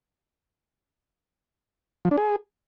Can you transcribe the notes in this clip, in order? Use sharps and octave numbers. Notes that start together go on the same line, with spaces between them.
F3
D4
G#4